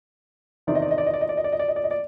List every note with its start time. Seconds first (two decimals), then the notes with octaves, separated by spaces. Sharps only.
0.67 E2 C3 D#3 D5
0.75 D#5
0.82 D5
0.91 D#5
0.98 D5
1.06 D#5
1.14 D5
1.21 D#5
1.29 D5
1.37 D#5
1.44 D5
1.52 D#5
1.59 D5
1.68 D#5
1.76 D5
1.84 D#5
1.91 D5